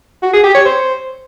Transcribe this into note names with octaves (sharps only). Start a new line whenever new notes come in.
F#4
G#4
G4
C#5
C5